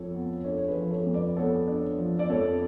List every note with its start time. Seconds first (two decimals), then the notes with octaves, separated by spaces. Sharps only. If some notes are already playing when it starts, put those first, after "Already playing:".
Already playing: F2 F3 A4 C#5
0.14 B3
0.44 D4 A4 C#5
0.58 C#5
0.68 G#4 B4
0.75 F3
0.91 A4 C#5
1.06 F2
1.13 B4 D5
1.37 B3 A4 C#5
1.67 D4
1.98 F3
2.19 D5
2.29 F2 A4 C#5